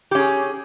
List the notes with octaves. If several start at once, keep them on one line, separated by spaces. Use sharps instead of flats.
C#4 G4 G#4